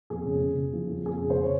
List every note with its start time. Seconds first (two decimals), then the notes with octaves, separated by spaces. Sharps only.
0.10 F2 G#4
0.26 C#3
0.42 C#3
0.58 C#3
0.73 F3
0.89 F2
1.05 F2 G#4
1.21 C#3
1.30 C5
1.37 C#3
1.44 C#5